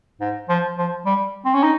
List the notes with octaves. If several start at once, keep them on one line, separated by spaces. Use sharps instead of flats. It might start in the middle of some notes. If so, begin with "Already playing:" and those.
G#2
F3
F3
G3
C4
C#4
D#4